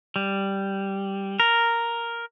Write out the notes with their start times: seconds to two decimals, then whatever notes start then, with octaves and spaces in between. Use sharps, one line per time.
0.16 G3
1.40 A#4